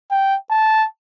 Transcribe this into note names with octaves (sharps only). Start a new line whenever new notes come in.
G5
A5